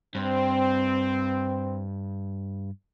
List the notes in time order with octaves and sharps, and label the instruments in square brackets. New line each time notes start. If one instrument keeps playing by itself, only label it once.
[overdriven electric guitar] G2 [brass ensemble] C4